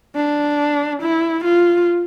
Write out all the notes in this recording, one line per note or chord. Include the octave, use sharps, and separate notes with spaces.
D4
E4
F4